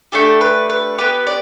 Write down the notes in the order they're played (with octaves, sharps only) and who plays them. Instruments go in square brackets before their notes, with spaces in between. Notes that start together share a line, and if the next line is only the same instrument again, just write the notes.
[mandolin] A3 D4 G4 A4
B4
B4
B3 G4 B4
D5